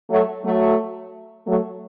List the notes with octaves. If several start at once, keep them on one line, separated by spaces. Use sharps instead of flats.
F#3 A3
F#3 A3
F#3 A3